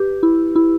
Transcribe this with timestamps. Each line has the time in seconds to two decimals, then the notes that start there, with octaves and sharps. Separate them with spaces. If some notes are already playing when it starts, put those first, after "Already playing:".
Already playing: G4 B4
0.23 E4
0.56 E4